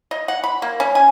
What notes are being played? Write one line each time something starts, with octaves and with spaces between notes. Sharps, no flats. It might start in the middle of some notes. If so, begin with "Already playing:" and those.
D#5
F#5
B5
A#3
C#4
G#5